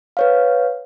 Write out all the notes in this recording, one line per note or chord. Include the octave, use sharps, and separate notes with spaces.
B4 C#5 F5